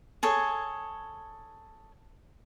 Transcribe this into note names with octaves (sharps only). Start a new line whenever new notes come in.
G#4 A4 C#5